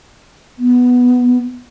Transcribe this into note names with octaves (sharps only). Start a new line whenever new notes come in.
B3